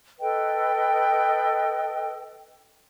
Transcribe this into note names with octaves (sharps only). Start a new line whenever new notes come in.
A4 B4 D#5 G5